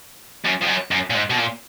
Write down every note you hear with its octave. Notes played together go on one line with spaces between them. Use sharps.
F#2
F2
F#2
F#2
A#2
G#2
B2
A#2